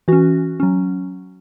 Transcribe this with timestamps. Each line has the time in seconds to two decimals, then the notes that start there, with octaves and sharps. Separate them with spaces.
0.08 E3 C#4 F#4
0.60 F#3 C#4